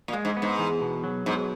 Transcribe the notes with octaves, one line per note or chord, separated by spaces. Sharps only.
A#2
G#3
G#2
B3
G#2
E2
B2
F#3
G#2 B2